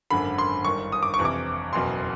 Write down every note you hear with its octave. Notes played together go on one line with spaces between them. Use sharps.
G#1 F#2 D3 B5
C6
G1 G2 D#3 C#6
D#6
D6
C#6
F2 C3 E3
D6
F#1 E2 B2 C6